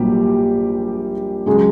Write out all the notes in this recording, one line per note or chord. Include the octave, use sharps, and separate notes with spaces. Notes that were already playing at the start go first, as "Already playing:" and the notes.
Already playing: A#1 A#2 F#3 G3 G4
C#3 F#3 G#3 G#4